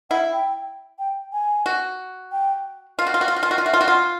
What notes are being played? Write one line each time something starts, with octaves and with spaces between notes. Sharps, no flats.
E4 F#5
G5
G5
G#5
F#4
G5
F4 F5
F#4
F4
F#4
F4
F#4
F4
F#4
F4
F#4 E5
F4
F#4
F4 F#5